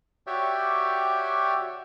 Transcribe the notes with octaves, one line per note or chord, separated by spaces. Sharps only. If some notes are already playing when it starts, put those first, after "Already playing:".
F#4 G4 C#5 D5 E5 G5